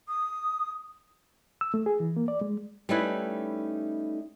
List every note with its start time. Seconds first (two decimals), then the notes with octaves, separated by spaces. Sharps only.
0.08 D#6
1.61 E6
1.74 A3
1.86 G#4
2.00 E3
2.16 A#3
2.28 D5
2.41 G#3
2.89 G3 A3 C#4 D#4 E4 B4